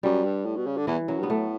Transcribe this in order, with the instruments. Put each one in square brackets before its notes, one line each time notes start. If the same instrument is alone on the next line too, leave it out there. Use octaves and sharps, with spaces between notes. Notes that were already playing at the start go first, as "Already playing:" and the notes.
[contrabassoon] F#2 [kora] G3
[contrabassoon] G2
A2
B2
C#3
D3
[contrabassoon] E2 [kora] E3
[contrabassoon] F#2 [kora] F#3
[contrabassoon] G2 [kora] B3
[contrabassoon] A2 [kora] A3